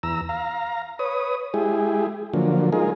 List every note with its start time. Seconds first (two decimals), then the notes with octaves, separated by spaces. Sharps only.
0.03 E2 A#5 E6
0.29 F5 A#5
0.99 B4 C#5 D#6
1.54 G#3 E4 G4 G#4
2.33 D3 F3 F#3 A#3
2.73 G#3 D#4 F4 G#4 A#4